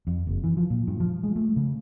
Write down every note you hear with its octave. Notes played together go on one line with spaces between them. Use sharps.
F2
F#1
E3
F3
A#2
G2
F3
G#3
A3
C#3